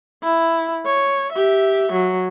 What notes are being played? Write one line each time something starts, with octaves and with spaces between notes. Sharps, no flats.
E4
C#5
G4 E5
F#3